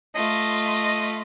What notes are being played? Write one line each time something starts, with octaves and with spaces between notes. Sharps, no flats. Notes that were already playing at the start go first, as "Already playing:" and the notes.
A3 F4 D#5